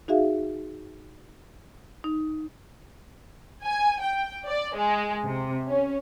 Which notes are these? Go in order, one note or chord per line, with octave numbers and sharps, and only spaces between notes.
D#4 F#4 G#4 E5 F5
D#4
G#5
G5
D5
G#3
C3
C#4